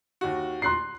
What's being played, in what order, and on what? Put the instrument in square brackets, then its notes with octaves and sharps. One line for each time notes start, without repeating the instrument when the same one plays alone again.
[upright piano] D#2 F#4
[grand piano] C6 F#6 C7